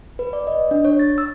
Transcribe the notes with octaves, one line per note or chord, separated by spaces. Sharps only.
B4
D5
D#5
D4
C#5
A6
E6